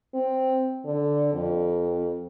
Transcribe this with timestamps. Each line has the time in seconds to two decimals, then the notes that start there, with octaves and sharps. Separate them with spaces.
0.14 C4
0.85 D3
1.33 F2